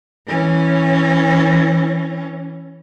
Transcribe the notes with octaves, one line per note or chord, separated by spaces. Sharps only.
E3 C#4